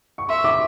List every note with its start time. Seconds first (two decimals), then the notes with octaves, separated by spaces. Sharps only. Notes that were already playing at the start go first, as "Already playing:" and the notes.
0.18 C#6
0.29 E5 C6
0.44 D6